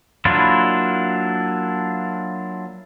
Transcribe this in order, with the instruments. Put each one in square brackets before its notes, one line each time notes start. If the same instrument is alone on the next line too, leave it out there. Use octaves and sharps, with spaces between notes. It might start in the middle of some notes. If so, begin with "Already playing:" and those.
[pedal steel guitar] F#3 A#3 D4 E4 F4